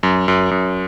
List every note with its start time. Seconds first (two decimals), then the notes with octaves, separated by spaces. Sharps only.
0.03 F#2
0.28 F#2
0.51 F#2